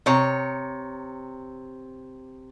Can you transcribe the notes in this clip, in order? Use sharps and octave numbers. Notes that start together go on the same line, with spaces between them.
C3 C#5 A#5